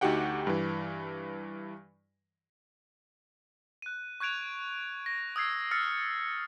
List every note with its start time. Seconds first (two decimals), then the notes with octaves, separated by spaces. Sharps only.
0.01 D2 D#4 F#4 G4 F#5 G5
0.47 G2 E3
3.82 F#6 D#7
4.20 C#6 F#6 G#6 D7 F7
5.06 A#6
5.36 D#6 E6 G#6 C7
5.71 E6 F6 A6 C#7